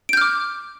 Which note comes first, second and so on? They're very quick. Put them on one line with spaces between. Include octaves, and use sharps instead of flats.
D7 G6 F6 D6